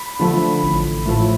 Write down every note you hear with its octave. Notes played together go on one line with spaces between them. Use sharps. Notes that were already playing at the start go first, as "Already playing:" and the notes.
Already playing: B5
D3 F3 A3
A1
A2 F3 A3